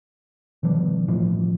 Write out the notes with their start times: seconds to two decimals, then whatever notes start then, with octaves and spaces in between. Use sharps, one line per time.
0.63 B2 D#3 F3 G3
1.08 A1 A2 F3 G3